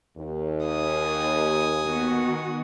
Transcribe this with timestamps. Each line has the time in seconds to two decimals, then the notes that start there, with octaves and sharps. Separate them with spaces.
0.17 D#2
0.66 G#5 D#6
1.84 D#3 B3 F#4